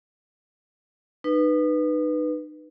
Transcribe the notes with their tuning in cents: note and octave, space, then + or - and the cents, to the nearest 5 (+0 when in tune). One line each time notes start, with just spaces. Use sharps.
D#4 -30 B4 +0